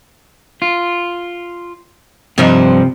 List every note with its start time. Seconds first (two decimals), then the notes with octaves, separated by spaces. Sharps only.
0.62 F4
2.38 G2 C3 F3 D#4